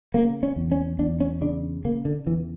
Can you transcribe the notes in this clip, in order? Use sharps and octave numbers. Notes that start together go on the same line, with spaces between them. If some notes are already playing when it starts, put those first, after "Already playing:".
C#3 A#3
C#4
E2
C#4
E2 D4
C#4
C#3 D4
C#3 A#3
D3
E2 E3